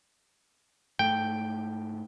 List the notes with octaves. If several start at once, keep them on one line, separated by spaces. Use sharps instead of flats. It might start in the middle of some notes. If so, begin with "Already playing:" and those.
G#2 A3 G5